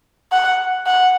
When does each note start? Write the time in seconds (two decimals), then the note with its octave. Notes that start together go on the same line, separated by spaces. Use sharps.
0.32 F#5
0.87 F#5